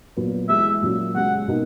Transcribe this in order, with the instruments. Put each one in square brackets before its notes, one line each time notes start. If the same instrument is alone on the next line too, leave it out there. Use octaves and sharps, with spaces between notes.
[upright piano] A#2 F#3 B3
[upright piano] E3 G#3 B3 [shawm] E5
[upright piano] A#2 F#3 C#4 F#4
[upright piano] F#2 C#3 G#3 [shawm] F#5
[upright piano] B2 A#3 D#4